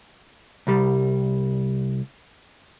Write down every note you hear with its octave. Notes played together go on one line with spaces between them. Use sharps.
C2 G3